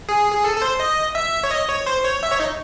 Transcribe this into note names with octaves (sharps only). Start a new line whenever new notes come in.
G#4
G#4
A4
A4
C5
D#5
E5
C#5
D#5
C#5
C5
C#5
E5
C#5
D#4